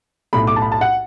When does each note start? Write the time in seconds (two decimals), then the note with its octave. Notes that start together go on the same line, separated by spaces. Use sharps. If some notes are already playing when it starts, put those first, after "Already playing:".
0.33 B1 A2 A3 B5
0.47 D6
0.56 A5
0.62 B5
0.72 A5
0.81 F#5